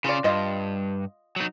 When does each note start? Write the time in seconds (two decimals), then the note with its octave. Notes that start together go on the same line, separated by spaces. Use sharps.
0.04 C#3 C#4 F4 D5
0.24 G2 F4 D#5
1.36 F#3 D#4